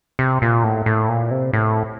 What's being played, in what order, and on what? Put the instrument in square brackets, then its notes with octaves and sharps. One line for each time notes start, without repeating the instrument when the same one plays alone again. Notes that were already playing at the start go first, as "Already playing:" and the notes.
[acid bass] C3
A#2
A2
A2
A#2
C3
A2